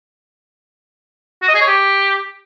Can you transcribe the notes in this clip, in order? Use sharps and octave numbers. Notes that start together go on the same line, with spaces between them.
F#4
D#5
G#4
C#5
G4